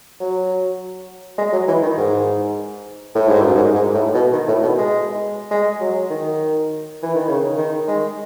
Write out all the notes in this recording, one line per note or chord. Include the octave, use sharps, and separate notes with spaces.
F#3
G#3
F#3
E3
D#3
G#2
A2
G#2
F#2
G#2
G#2
A2
B2
D#3
A2
B2
G#3
G#3
F#3
D#3
E3
D#3
C#3
D#3
G#3